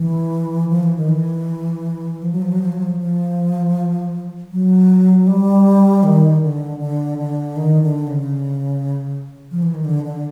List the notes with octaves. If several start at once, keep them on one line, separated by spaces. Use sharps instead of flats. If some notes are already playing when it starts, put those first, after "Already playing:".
Already playing: E3
F3
E3
D#3
E3
F3
F#3
F3
F#3
F3
F#3
F3
F3
F#3
G3
D#3
D3
D3
D3
D#3
D3
C#3
F3
E3
D#3
D3
D3